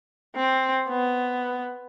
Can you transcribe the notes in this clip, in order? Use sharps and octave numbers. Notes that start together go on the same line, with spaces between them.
C4
B3